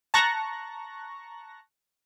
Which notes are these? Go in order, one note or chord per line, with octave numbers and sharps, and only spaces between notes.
A5 A#5 C#6 F#6 A#6